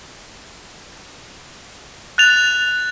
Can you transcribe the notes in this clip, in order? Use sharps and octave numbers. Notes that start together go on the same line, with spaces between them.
F#6 A6 F7